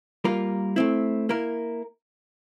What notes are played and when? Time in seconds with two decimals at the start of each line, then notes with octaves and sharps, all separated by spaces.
0.24 G3 A#3 F4 A#4
0.76 A3 C4 E4
1.29 A#3 E4 A#4